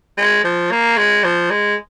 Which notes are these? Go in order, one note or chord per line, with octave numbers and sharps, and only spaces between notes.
G#3
F3
A#3
G#3
F3
G#3